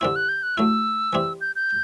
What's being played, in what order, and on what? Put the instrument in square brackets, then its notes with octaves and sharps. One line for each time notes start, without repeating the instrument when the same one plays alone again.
[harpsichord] D3 G3 C4 E4 [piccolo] E6
[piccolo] F#6
G6
F#6
[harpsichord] F#3 A3 E4 [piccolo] E6
[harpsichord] E3 G3 C4 E4
[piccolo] G6
G6